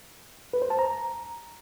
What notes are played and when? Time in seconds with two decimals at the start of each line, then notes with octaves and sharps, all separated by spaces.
0.53 B4
0.62 C5
0.70 A5
0.79 A#5